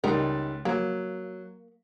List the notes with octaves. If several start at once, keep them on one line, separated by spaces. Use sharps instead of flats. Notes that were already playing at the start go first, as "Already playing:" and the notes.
C#2 G3 D#4 A#4
F#3 A#3